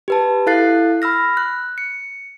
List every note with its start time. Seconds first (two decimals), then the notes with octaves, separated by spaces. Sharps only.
0.08 G4 B4 A5
0.47 E4 A4 F5 F#6 A6 C7
1.02 B5 E6 F6 A#6
1.37 F#6
1.78 C#7